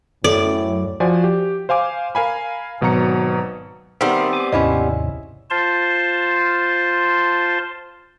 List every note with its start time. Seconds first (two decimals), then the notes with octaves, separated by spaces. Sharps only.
0.24 F#2 A2 A4 D5
1.00 F3 F#4 C5 D5 G#5
1.24 G4
1.69 C5 F5 G#5 D6
2.15 A#4 F5 G#5 B5
2.81 G#1 B2 F#3 A#5 C#7
4.01 D#3 G3 B3 C4 A#4 E5
4.33 G#5 D6
4.52 D#2 G#2 C3 C#4 E4 D#5
5.50 F4 C5 A5 C6